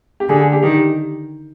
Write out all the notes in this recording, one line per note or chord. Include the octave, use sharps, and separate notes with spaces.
G4
D3 G#4
G#4
G4
D#3 G4